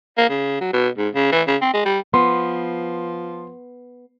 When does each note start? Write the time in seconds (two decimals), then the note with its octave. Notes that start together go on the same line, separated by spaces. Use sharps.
0.18 A#3
0.29 C#3
0.61 F#3
0.73 B2
0.98 G#2
1.14 C#3
1.32 E3
1.47 C#3
1.61 C4
1.74 G#3
1.85 G3
2.14 F3 B3 C6